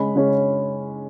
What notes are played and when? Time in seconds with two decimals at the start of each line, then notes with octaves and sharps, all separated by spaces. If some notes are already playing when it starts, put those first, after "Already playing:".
Already playing: C#3 G#3 C#4 B5
0.16 C#3 G#3 C#4